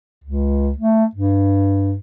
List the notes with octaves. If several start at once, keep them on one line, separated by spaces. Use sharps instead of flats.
C#2
A3
G2